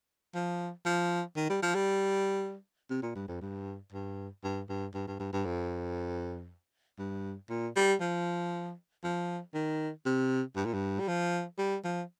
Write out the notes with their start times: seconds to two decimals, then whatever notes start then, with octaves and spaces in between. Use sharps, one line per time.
0.35 F3
0.86 F3
1.36 D#3
1.50 G3
1.63 F3
1.75 G3
2.90 C3
3.03 A#2
3.16 G2
3.28 F2
3.42 G2
3.93 G2
4.44 G2
4.69 G2
4.94 G2
5.08 G2
5.20 G2
5.33 G2
5.46 F2
6.99 G2
7.50 A#2
7.76 G3
8.01 F3
9.04 F3
9.55 D#3
10.06 C3
10.56 G2
10.66 A#2
10.74 G2
11.00 G3
11.08 F3
11.58 G3
11.84 F3